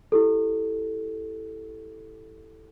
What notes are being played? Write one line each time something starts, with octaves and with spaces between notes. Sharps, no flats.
E4 G4 A4